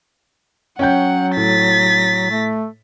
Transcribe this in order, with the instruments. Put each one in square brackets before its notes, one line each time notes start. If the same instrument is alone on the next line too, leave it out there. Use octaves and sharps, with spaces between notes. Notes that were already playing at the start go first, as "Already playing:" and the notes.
[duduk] F#3 [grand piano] C#4 G5 G6 [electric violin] F#5
[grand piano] A2 [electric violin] A6 B6
[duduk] A3